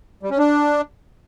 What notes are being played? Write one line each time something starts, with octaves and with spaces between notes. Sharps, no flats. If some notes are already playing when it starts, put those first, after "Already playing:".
G3
C#4
D4